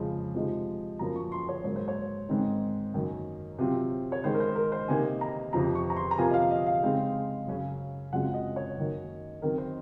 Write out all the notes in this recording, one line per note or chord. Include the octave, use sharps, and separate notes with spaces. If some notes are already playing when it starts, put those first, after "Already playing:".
Already playing: F2 C#3 F3 G#3
C3 F3 G#3 D#4
F#2 F3 A#3 C#4 A#5
C#6
C6
C#5
G#2 F#3 A#3 C#5
C5
C#5
G#2 D#3 G#3 C4 D#4
F#2 D#3 A#3 C#4
C3 F#3 C4 F4
C#5
D#3 G#3 D#4 C5
A#4
C5
A#4
C5
C3 D#3 A#3 D#4 G#5
A#5
F2 C3 F3 A#5
C#6
A#5
C6
A#5
C3 F3 A#3 F4 G#5
D#5
F5
D#5
F5
C#3 G#3 C4 D#4
F#2 C#3 F#3 C#4
F#2 C#3 G#3 C4 F4 F#5
D#5
C#5
F#2 D#3 A#3 D#4
D#3 F#3 C4 D#4 A#4
C5